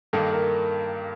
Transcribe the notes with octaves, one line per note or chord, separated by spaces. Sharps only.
G2 D#3 A#3 A4
A#4